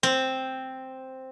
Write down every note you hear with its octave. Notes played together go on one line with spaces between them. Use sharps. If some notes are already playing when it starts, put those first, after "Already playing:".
C4